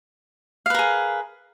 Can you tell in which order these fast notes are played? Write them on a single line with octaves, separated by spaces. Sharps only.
F5 B4 A#4 G#4